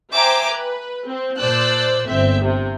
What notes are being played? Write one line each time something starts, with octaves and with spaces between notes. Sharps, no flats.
C5 E5 G5 G#5 A#5 D6
B4
C4
A#2 C5 D5 A5 E6 F#6
G1 C4 E5
C3